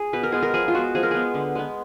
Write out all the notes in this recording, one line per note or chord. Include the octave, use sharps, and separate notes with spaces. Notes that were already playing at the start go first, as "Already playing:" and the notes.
Already playing: G#4
B2 B4
A#4
G#3 B3 G#4
A#4
F3 G#4
F4
G#3 B3 F#4
F3 G#4
A#4
G#3 B3 G#4
D3
G#3 B3